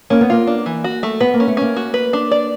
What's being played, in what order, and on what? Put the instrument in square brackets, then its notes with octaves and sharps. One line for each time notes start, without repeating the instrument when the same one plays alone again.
[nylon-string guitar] A#3 [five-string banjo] C#4
[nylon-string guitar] B3
[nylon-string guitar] A#3 [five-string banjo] F4
[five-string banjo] D4
E3
F#4
A3
[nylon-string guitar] B3 [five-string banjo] B4
[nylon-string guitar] A#3
[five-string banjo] C#4
[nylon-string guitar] A3
[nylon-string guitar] A#3 [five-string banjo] C#4
[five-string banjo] F#4
B4
D4
D5